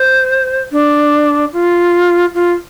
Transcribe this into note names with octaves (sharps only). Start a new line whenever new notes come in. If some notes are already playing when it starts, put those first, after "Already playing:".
Already playing: C5
D4
F4
F4